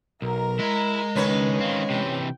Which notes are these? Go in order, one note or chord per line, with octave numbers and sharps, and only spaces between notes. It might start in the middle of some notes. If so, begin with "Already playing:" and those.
B1 A#4 A#5
G#3 E4 D#5
C#2 D#3 C#4 B4 C#5
D#3 C4 F5
C3 E3 G5